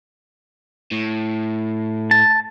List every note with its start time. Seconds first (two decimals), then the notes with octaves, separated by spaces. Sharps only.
0.92 A2
2.11 A5